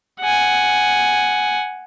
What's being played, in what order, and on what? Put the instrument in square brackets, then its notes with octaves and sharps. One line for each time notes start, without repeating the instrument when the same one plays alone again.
[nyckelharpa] F#5 G#5